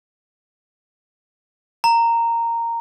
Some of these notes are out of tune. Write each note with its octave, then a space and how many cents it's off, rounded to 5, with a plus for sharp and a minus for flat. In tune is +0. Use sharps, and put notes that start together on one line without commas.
A#5 -10